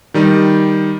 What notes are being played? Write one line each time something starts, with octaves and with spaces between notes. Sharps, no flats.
D#3 G3 D#4